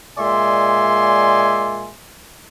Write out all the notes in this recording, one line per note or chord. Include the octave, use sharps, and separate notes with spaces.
A#2 G#3 D5 E5 G#5 C6